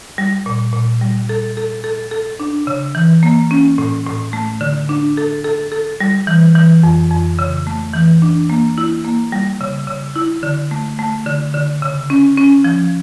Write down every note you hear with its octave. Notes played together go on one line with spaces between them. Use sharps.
G3
A#2
A#2
G3
A4
A4
A4
A4
D4
C#3
E3
A#3
C#4
A2
A2
A3
D3
D4
A4
A4
A4
G3
E3
E3
F2
F2
C#3
A3
E3
D4
A#3
E4
A#3
G3
C#3
C#3
E4
D3
A3
A3
D3
D3
C#3
C#4
C#4
F3